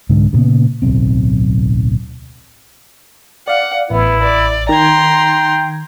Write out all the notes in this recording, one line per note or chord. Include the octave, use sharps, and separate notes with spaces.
C2 G#2 D3
G2 A#2 C#3 B3
D1 B1 C4
D5 F5 F#5
A1 B3 E4
D5
D#3 G5 A#5 C6 G#6